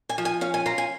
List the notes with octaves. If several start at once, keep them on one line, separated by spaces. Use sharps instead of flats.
G#5
F3
G#5
C#4 F5
G#5
F4 A#5
G#5